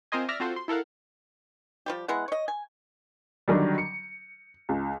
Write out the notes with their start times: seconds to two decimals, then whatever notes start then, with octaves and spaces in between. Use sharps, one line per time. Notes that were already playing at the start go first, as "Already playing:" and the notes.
0.12 C4 F4 A#4 C5 D#5 G#5
0.28 D5 E5 F6 A#6
0.40 C4 F4 F#4 A4 C5
0.56 C6
0.68 E4 A4 A#4 F5 F#5
1.86 F3 G3 G4
2.08 G#3 B3 E4 F#5
2.28 C#5 D#5
2.48 G#5
3.48 D3 D#3 F#3 G3
3.78 C#7
4.69 C#2